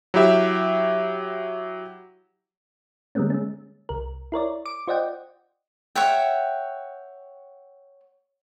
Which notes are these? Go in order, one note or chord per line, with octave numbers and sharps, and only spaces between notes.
F#3 E4 G4 E5
D3 G3 G#3 A#3 B3 C#4
G#3 C#4
C2 A#4
E4 A#4 C#5 D5
D6 D7
F4 C5 D5 D#5 F#5 G5
C#5 E5 F#5 G5